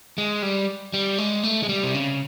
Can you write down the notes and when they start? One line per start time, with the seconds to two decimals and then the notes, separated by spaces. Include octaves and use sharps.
0.18 G#3
0.42 G3
0.94 G3
1.18 G#3
1.43 A3
1.63 G#3
1.69 G3
1.83 C3
1.95 C#3